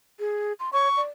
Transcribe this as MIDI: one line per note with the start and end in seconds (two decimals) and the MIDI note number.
0.19 0.53 68
0.59 0.70 84
0.73 0.88 73
0.73 1.01 85
0.97 1.08 74